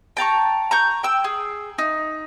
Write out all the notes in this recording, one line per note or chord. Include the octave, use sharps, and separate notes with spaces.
G5 A5 A#5 C#6
A#5 C#6 G6
G5 E6
G#4
D#4